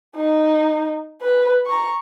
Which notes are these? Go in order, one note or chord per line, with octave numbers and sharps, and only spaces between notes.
D#4
B4
A#5 C#6